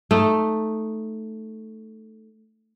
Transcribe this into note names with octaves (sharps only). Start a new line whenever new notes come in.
A3 D#4